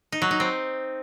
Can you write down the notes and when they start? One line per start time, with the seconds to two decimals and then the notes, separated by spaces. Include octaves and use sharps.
0.12 D#4
0.22 F#3
0.31 D#4
0.40 C4